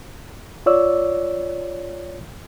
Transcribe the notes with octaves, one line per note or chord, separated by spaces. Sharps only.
F4 C#5 D5 E6